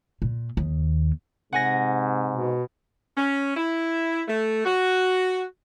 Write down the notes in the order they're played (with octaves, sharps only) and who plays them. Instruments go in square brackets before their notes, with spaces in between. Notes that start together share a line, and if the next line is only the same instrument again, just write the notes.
[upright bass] A#2
D#2
[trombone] G#2 [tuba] C3 [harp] F#5 G#5 A#6
[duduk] B2
[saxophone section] C#4
E4
A3
F#4